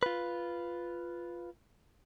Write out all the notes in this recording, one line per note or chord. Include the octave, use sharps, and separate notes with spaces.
F4 B4